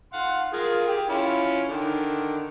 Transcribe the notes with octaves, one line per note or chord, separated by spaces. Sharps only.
F5 F#5 C6
F4 G#4 A#4
G4 G#4
C#4 E4 F4
D3 D#3